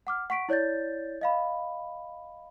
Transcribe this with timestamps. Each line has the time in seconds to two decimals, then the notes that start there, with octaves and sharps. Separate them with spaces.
0.07 F#5 D6 F6
0.30 F#5 C#6 B6 D7
0.49 E4 C#5 D5 G6 A6
1.21 D#5 F5 B5